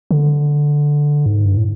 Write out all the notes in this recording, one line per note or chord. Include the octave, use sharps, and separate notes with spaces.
D3
G#2
G2
A2